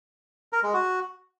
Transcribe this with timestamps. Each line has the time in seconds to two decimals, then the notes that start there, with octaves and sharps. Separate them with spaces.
0.53 A#4
0.63 G#3
0.74 F#4